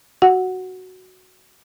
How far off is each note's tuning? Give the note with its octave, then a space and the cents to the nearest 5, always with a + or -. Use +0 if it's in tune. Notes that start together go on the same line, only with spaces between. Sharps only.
F#4 +0 F#5 +0